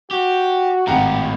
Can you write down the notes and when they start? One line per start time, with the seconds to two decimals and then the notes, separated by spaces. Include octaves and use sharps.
0.11 F#4 G4
0.87 G#1 A2 D#3 G4 F#5 A#5